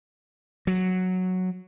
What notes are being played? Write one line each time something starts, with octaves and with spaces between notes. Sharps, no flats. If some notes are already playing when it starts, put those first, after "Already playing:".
F#3